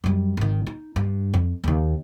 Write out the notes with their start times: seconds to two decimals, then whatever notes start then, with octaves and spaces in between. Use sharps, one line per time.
0.04 F#2 G3
0.37 G#1 D#3
0.67 D#4
0.96 G2
1.34 F2
1.64 D#2 D#3